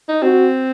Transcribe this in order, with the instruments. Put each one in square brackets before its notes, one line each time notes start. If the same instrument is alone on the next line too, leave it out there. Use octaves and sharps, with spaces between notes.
[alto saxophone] D#4
[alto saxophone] C4 [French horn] F#4